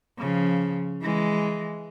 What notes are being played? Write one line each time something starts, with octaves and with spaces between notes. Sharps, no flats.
C#3 F3
E3 G#3